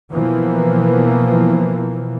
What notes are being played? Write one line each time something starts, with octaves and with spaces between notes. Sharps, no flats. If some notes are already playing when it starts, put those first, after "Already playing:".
B2 E3 F3 A#3 B3